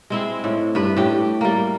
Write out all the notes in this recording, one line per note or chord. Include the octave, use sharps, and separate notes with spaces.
G#3 C4 E4
A2
G2 B4
A2 G4
G3 A#3